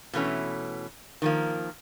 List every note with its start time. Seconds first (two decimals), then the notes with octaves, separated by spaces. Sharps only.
0.13 B2 E3 A3 C#4
1.22 D#3 F3 A#3